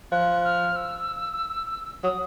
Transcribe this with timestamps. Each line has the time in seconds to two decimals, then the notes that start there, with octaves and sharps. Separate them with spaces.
0.12 F3 F#6
0.44 F6
0.76 E6
2.04 F#3 D#6